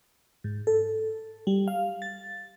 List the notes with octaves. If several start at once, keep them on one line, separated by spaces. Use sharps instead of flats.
G#2
A4
G3
F5
A6